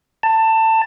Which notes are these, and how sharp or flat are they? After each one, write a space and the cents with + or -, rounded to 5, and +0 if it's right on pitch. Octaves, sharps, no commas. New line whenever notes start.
A5 +20